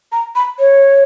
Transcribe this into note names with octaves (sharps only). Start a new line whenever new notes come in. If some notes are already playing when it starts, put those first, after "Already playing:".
A#5
B5
C#5